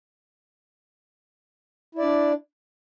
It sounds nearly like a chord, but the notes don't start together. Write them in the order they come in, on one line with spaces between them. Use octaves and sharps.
E4 D5 D4